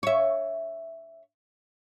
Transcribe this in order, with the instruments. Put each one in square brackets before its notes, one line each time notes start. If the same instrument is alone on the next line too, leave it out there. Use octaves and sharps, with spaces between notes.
[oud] C#5 E5